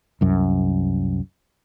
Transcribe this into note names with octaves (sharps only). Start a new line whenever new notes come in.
C2 F#2